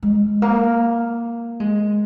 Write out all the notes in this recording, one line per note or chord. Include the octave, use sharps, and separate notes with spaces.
G#3
A#3
G#3